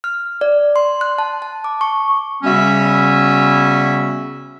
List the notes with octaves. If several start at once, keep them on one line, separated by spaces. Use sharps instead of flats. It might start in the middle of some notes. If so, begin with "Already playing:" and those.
F6
D5
C6
F#6
A5
A5
D6
C#6
C#3 G3 B3 C#4 F#4 E5